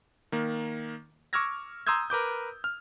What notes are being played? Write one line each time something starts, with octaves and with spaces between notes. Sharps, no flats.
D#3 A#3
C#6 D6 E6 F6 G#6 A#6
A#5 C6 D#6 E6 G6 G#6
A#4 B4 D6 G6
F6